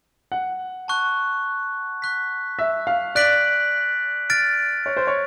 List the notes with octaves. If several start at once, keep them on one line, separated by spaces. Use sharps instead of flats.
F#5
A5 C#6 F#6
C#6 F#6 B6
E5
F5
D5 F#6 B6 D7 F#7
F6 A6 D7
C#5
C5
C#5